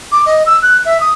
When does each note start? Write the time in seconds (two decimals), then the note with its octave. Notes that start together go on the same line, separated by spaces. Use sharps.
0.12 D6
0.26 D#5
0.46 E6
0.62 F#6
0.85 E5
1.01 D#6